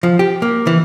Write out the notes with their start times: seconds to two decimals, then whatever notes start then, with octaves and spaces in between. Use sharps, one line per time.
0.03 F3
0.19 G4
0.42 A#3
0.67 E3